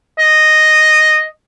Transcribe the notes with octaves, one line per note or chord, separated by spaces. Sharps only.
D#5